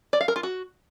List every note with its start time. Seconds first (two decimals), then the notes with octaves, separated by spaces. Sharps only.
0.13 D5
0.21 F5
0.28 A#4
0.36 F4
0.43 F#4